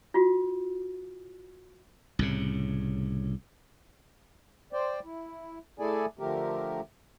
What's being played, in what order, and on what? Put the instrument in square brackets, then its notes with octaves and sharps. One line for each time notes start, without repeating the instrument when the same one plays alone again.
[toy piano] F4 F#4
[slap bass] C2 A2 C#3
[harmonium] C5 D5 G5
E4
A3 E4 G#4 A4 D5 G#5
D3 F3 A3 G4 A#4